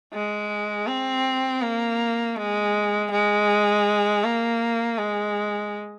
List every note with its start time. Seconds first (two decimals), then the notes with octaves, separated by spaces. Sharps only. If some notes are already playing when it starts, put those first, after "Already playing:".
0.13 G#3
0.88 C4
1.62 A#3
2.37 G#3
3.11 G#3
4.24 A#3
4.98 G#3